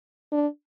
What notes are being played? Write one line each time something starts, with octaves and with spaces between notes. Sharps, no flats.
D4